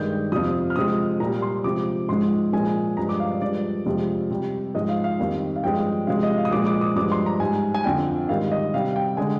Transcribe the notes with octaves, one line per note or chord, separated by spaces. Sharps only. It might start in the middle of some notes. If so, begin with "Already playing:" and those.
Already playing: G2 D#3 G#3 G6
F2 C3 F3 D#6
F6
C3 F3 G#3 D#6
A#2 G3 A#5
C6
C3 F3 G#3 D6
G#2 F3 G#3 C6
A#2 F3 G#3 G#5
G2 F3 G#3 A#5
D6
F5
D5
G2 F3 G#3 D5
F2 C3 F3 G#3
C3 G3
G#2 F3 G#3 D#5
F5
F5
F2 D#3 G3
F5
G2 F3 G#3 G5
C3 F3 G#3 F5
D#5
F5
D#6
A#2 F3 G#3 D6
D6
D#6
G2 F3 G#3 D6
C6
A#5
G#2 G3 G#5
G#5
F2 D3 F3 G5
G#2 D#3 G3 F5
D#5
C3 G3 F5
G5
D3 G#3 G#5